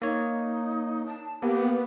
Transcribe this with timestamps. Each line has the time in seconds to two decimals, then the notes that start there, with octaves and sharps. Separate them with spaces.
0.02 A#3 D#4 C#5
1.07 A5
1.42 A#3 B3 G4
1.72 B3